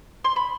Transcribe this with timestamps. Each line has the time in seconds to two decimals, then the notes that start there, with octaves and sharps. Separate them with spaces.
0.24 C6
0.36 B5